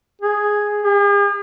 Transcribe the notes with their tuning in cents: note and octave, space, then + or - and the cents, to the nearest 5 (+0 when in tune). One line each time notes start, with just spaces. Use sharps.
G#4 +0
G#4 -45